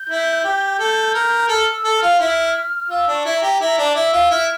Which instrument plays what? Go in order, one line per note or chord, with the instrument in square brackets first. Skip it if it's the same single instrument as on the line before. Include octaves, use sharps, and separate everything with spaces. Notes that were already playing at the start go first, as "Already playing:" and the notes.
Already playing: [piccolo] G6
[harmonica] E4
G4
A4
A#4
[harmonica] A4 [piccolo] F6
[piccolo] E6
[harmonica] A4
[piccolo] F6
[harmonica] F4
E4
[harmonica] F4 [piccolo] E6
[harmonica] D4
[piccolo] C#6
[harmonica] E4
[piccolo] A#5
[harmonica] G4
[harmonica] E4 [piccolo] A#5
[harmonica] D4
[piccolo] D6
[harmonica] E4
[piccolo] E6
[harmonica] F4
[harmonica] E4 [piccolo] F6